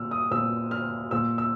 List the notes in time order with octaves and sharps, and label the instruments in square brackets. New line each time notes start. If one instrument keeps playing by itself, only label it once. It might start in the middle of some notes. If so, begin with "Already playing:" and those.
Already playing: [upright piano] A#2 E6 F6
D#6
A#2 E6
F6
A#2 E6
E6